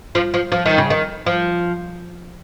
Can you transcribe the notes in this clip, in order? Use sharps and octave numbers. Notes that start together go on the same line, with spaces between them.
F3
F3
F3
D#3
C#3
D#3
F3